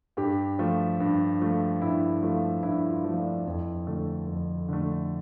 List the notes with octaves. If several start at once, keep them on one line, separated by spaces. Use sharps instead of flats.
G2 G4
F3 A3
G2
F3 A3
G2 E4
F3 A3
G2 E4
F4
F3 A3
D4
F2 E4
D3 A3
F2
D3 A3